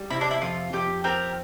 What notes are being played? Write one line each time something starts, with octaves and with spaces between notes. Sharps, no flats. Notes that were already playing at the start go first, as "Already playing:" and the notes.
Already playing: G3
C3 E4
D4
E4
F2 F4
F2 G4
C4 G4 A#4